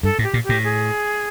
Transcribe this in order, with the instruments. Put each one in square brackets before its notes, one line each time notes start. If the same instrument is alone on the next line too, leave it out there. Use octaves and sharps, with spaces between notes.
[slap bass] G2 [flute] A4
[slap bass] A2
[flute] G4
[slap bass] A#2
[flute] G4
[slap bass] A2
[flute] G#4